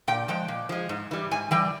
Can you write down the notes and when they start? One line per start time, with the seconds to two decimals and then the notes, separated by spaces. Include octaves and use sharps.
0.08 A#2 G5
0.28 F3 G#3 G5
0.48 A#2
0.69 F3 G#3
0.89 G#2
1.11 E3 G3
1.31 G#2 G#5
1.51 E3 G3 G5